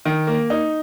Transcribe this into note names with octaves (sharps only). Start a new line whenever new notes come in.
D#3
A#3
D#4